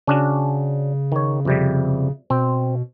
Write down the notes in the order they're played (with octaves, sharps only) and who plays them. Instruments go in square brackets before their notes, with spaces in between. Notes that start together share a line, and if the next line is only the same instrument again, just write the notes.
[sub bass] C#3 [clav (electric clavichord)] C#4 D4 F#4
[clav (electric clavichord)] D#3 C#5
F2 C3 G3
[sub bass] B2 [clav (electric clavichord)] C4